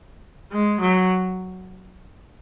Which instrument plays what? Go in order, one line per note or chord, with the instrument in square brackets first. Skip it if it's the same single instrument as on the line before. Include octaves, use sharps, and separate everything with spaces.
[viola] G#3
F#3